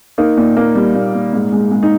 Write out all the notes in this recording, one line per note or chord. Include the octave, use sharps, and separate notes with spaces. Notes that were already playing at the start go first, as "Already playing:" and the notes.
A#3 D#4
A#2
A#3
G3
A#2
A#2
G#2
G#3
G#3
D#4